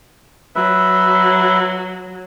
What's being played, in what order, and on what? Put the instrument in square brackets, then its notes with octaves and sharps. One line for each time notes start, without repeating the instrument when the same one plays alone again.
[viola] F#3 [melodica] B4 E5